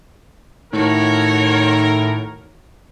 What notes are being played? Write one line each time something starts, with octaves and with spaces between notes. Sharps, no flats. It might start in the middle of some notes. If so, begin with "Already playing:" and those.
A2 D#3 F#4 A#4 C#5